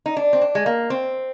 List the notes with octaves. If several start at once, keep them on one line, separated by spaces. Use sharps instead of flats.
D#4
D4
C4
D4
G#3
A#3
C4